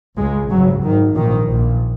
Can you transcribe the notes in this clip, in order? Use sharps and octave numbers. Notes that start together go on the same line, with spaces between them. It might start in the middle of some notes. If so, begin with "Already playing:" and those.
C#2 C#3 G#3
G#1 F#2 C#3 F#3
G#1 G#2 D#3
A#1 G#2 D#3
A#1 A#2